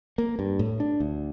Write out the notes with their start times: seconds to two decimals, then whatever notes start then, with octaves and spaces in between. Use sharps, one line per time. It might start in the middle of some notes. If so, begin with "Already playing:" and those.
0.18 A#3
0.39 G2
0.59 A2
0.80 D4
1.00 D2